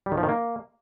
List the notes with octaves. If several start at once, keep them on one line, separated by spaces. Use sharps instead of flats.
G3
D#3
F3
D#3
A#3